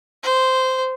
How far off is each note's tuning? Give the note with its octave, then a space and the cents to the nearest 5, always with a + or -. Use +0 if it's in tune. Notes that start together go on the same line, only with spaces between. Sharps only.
C5 -10